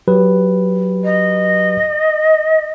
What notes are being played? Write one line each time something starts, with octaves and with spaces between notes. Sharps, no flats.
F#3 G4 B4
D#5